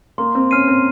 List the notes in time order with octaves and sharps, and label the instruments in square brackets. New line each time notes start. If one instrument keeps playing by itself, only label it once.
[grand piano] A#3 [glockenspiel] C6
[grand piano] C4
[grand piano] C#4 [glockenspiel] F6 C7 D#7
[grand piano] C4